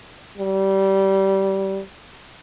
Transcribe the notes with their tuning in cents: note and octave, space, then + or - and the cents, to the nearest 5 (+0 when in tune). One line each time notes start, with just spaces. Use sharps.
G3 -20